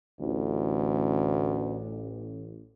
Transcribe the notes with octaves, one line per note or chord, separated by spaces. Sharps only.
A1 D2